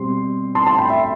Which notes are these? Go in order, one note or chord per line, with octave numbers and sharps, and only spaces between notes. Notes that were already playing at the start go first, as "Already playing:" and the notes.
Already playing: B2 G3 C4 C6
A5 C6
A5 C6
G5 B5
E5